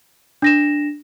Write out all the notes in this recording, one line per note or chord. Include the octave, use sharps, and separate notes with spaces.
D4 A#6 E7